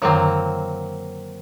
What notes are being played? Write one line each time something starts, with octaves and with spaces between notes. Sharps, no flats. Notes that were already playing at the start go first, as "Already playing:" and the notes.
F#2 D3 D#3 F#3 A#3 C4